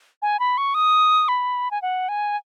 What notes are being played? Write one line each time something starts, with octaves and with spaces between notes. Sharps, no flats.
G#5
B5
C#6
D#6
B5
G#5
F#5
G#5